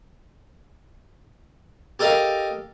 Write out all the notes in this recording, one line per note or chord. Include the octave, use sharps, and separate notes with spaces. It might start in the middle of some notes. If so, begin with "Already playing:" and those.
G4 A4 A#4 D#5 F5